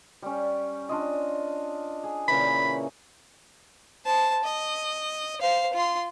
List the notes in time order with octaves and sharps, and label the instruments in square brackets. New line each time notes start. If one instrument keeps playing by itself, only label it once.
[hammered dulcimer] G3 C#4
D4 F4 D#5
G#4
[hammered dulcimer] A#2 C#3 E3 [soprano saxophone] B5
[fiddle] C5 A5
D#5
C5 F5
F4 C6